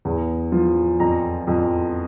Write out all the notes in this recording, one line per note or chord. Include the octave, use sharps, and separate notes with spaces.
E2
F3
F2 A#5
F2